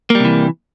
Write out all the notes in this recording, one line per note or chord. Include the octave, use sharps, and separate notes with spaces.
C3 E3 G3 A#3